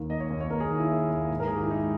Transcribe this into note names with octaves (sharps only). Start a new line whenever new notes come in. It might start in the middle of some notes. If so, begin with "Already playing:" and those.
Already playing: D#2 D#3
A#3 D#5
C#5
D#2
C#5
D#2 A#4
G#4
D#3
E4
A#3
D#2
G#2
A#4
D#3 G#4
G4
E4
G#3 D#4